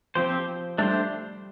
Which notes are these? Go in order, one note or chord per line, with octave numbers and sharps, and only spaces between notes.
F3 C4 G4 C5
G3 A3 D4 G4 C5